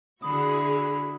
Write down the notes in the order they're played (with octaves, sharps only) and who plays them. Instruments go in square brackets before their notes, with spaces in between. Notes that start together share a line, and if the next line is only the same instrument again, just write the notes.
[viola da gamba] D3 [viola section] E4 F#4 G#4 [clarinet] B5 [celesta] D#6